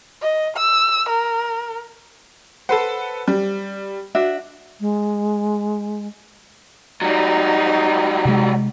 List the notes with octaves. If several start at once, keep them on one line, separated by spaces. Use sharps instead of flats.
D#5
E6
A#4
A4 B4 C5 F#5
G3
D4 F#4 E5
G#3
F#3 G3 D#4
C3 G#3